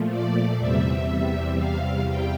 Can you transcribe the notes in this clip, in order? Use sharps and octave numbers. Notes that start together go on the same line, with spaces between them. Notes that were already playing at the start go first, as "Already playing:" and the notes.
Already playing: A#2 F3 A3
D5
E2 C3 G3 E5
F5
G5